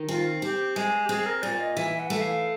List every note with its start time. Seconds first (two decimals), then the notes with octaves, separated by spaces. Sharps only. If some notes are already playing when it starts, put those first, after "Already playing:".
Already playing: D#3
0.08 C4 F4
0.42 C4 G4
0.75 G#3 G#4
1.05 G4
1.09 C4 G#4
1.26 A#4
1.42 A#2 D5
1.60 D#5
1.77 E3 E5
2.00 F#5
2.10 A3
2.17 E5
2.21 F5